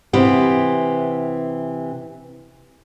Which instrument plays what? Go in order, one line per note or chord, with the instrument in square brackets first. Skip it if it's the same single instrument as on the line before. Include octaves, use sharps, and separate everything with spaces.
[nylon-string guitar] C3 E3 B3